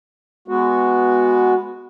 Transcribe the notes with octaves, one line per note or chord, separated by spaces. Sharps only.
G#3 B3 F#4